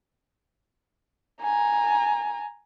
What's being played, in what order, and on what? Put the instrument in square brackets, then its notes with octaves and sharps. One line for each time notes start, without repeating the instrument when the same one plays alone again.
[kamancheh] G#5 A#5